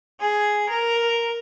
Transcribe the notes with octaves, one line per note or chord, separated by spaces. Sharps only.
G#4
A#4